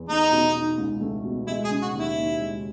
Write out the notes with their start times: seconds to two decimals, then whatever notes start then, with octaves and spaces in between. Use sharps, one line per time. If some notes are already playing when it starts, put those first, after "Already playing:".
Already playing: E2
0.09 A3 D#4
0.32 B2
0.55 D#4
0.78 C#2
1.01 A3
1.24 B2
1.47 G#3 E4
1.65 G#4
1.70 C#3
1.82 F#4
1.93 D#2
1.99 E4
2.16 D#2
2.39 G#3